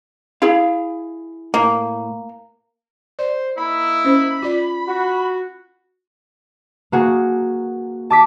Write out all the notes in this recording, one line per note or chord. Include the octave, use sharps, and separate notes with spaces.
E4 G#4 F5
A2 A#3
C5 D5
A#3 D#4 E4 B5
C#4 C5
F4 D5
F#4
A#3 F#4 G#4
A5 D6 B6